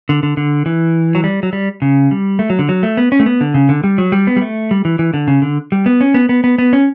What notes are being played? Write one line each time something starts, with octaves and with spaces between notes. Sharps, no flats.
D3
D3
D3
E3
F#3
G3
F#3
G3
C#3
G3
A3
F#3
D3
F#3
A3
B3
C#4
A3
B3
D3
C#3
D3
G3
F#3
G3
B3
G3
A3
G3
E3
E3
D3
C#3
D3
G3
B3
C#4
B3
B3
B3
B3
C#4